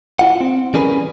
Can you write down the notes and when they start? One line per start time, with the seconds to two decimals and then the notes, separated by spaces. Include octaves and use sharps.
0.19 E4 F4 F#5
0.41 C4
0.74 E3 G3 C#4 G#4 A#4 B4